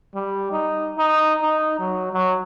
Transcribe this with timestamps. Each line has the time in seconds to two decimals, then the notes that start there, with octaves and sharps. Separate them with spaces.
0.15 G3
0.52 D#4
0.98 D#4
1.42 D#4
1.79 F#3
2.13 F#3